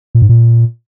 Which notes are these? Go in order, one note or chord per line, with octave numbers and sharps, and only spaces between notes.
A#2
G#2
A#2